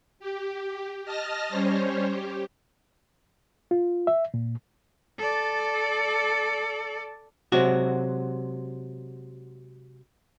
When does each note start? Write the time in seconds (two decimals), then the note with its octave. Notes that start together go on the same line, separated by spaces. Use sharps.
0.19 G4
1.05 D#5 A5 F6 A#6
1.49 G3 C#4 C5 C#5
2.09 G4
3.71 F4
4.07 E5
4.34 A#2
5.18 A4 D5
7.52 C3 F#3 G#3 F#4